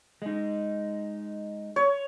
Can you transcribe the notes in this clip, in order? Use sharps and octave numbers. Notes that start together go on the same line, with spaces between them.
G#3 D#4
C#5